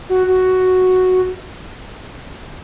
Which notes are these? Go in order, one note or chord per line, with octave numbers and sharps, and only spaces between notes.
F#4
F#4